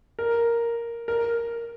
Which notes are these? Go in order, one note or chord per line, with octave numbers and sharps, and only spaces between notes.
A#4
A#4